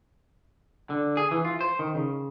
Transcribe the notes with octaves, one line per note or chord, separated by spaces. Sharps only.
D3
G#4
E3
F4
C5
D#3
C#3